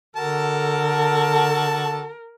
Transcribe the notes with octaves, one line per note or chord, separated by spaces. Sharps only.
D3 F#4 A4 A#4 A5